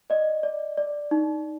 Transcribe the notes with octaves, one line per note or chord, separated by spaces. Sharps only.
D5 D#5
D5
D5
D#4